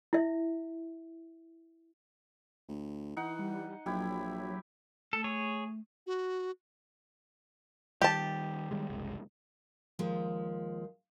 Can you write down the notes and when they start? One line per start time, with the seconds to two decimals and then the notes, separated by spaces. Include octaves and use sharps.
0.13 E4 E5
2.69 D2
3.17 E3 D#4 F#5
3.39 G3
3.86 A#1 F#3 E4 G4
5.13 A3 A4
5.24 G#4 C#5
6.07 F#4
8.02 D#3 G3 G4 A5
8.71 D#3 G3 G#3
8.90 F#1 C2 G#3
9.99 D#2 F3 G#3